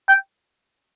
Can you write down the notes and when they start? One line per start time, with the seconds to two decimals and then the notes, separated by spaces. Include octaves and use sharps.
0.09 G5